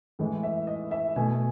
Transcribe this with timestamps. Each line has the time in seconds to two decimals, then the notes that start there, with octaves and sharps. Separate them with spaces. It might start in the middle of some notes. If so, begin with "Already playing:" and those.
0.19 A2 E3 G#3
0.43 E5
0.67 D#5
0.91 E5
1.16 B2 A3 G#5